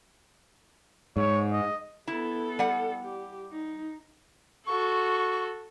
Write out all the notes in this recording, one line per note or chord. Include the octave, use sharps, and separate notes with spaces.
G#2 C#5
D#5
B3 E4 A4
G3 F#5
G4
D#4
F#4 A4 C#6